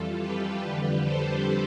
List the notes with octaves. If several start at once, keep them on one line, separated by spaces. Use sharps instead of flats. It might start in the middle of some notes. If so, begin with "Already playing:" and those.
Already playing: F2 E3 G3 F4 A4
G4 B4
F2 D3 G3
A4 C5